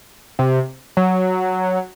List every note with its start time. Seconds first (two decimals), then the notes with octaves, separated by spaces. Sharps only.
0.39 C3
0.97 F#3